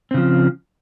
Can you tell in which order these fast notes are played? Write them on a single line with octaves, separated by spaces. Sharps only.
C4 C#3 F3